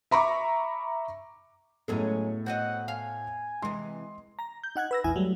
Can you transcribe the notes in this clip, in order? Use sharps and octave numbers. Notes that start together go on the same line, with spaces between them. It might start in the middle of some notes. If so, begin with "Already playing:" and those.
E5 A#5 B5 C#6 D6
A2 F#3 G#3 B3 C#4 A4
C4 F#4 D#5 F#5
F5 G#5
C3 E3 G#3 C6
A#5 A#6
G6
D#4 F#5 F#6 G#6
B4 E6 A#6
A#1 E2 E4 E5 G#5
F#3 G3 A3